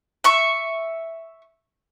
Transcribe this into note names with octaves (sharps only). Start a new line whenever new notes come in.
E5 C#6